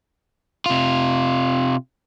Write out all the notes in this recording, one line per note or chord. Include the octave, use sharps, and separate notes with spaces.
C3 F4